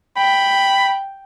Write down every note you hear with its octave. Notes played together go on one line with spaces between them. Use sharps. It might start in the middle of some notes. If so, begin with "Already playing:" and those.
G5 B5